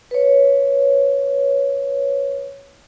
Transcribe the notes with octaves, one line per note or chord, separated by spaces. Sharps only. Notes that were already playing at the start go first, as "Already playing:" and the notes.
B4 C#5